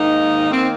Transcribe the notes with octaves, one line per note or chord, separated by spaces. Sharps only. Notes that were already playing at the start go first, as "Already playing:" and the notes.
Already playing: G#2 D#3 A#3 D#4
D#3 A#3 C4